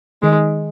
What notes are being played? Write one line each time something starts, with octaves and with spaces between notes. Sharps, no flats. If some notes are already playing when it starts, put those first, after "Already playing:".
D#3 G#3